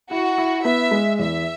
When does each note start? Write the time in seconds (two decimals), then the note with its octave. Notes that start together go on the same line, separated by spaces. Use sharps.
0.11 E4 F#4
0.38 E4
0.65 B3 E5
0.91 G#3
1.19 E2 E5